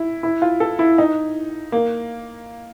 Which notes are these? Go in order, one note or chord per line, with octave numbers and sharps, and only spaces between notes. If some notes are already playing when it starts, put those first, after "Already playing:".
Already playing: E4
E4
F4
A4
E4
D#4
A#3